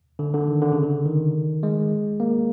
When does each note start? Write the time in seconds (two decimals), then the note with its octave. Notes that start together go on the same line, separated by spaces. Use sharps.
0.19 D3
0.34 D3
0.48 D#3
0.62 D3
0.72 C#3
0.83 D3
1.06 D#3
1.63 G#3
2.20 A#3